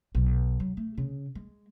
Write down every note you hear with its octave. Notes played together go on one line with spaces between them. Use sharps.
B1
F#3
A3
C#3
G#3